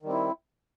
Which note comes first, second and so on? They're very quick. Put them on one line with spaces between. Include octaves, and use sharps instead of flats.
D#3 G3 C4 E4